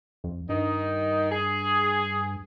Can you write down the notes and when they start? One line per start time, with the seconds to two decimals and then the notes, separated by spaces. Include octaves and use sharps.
0.24 F2
0.49 G2 D#3 D#4
1.31 G#4